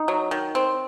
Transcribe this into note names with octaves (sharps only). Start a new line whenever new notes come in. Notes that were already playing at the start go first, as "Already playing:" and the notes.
Already playing: D#4
F#3
D#3
C4